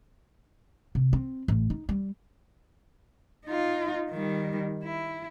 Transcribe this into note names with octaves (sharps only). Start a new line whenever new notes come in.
C3
C4
A1
D#4
G3
D#4 F4
D#3 G3
E4